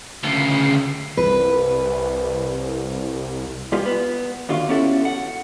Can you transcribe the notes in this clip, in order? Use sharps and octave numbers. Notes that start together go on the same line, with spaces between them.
D2 C#3
C2 B4
G3 G#3 B3 F4 G4
B3 B4
D#2 D3 F4 F#4 F5
B3 C#4 E4 F#4 G4 A4
F#5